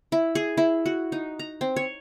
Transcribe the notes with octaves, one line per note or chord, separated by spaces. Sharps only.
E4
G#4
E4
F#4
D#4
A#5
C4
C#5